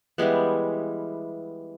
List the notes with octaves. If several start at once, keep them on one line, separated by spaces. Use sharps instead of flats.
E3 G3 G#3 B3